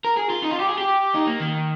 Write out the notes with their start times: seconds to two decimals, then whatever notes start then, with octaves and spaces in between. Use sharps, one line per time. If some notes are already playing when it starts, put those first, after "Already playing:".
0.04 A#4
0.17 G#4
0.30 F4
0.42 D#4
0.51 F4
0.59 G4
0.69 G#4
0.78 G4
1.14 D#4
1.27 A#3
1.40 D#3